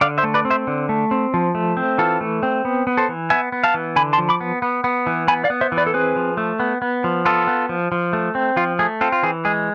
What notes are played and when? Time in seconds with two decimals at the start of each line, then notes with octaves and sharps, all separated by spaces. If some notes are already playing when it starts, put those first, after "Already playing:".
0.01 D3 D5 F5
0.18 C5 E5
0.24 A3
0.34 B4 D5
0.45 C4
0.51 C5 E5
0.67 D3
0.89 A3
1.11 C4
1.34 F3
1.55 A3
1.77 C4
1.98 E3 F4 A4
2.21 A3
2.43 C4
2.65 B3
2.87 B3
2.97 A4 C5
3.09 E3
3.30 B3 E5 G#5
3.52 B3
3.64 F5 A5
3.74 E3
3.96 D3 G#5 B5
4.13 A5 C6
4.18 F3
4.29 B5 D6
4.41 B3
4.62 B3
4.84 B3
5.07 E3
5.28 B3 G#5 B5
5.44 D5 F5
5.50 B3
5.61 C5 E5
5.72 E3
5.77 B4 D5
5.87 A4
5.94 C4 G#4 B4
6.16 F3
6.37 A3
6.60 B3
6.82 B3
7.04 F3
7.25 B3 F4 A4
7.47 B3
7.69 F3
7.92 F3
8.13 A3
8.35 C4
8.57 F3 F4
8.79 A3 G#4
9.01 C4 F4 A4
9.12 F4
9.23 E3 G#4
9.45 G#3 G#4